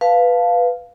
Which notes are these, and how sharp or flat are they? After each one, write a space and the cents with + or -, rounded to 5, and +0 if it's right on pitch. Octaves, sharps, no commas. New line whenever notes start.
B4 +0 F5 +0 A5 +0